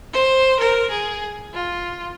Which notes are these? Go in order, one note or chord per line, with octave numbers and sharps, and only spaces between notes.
C5
A#4
G#4
F4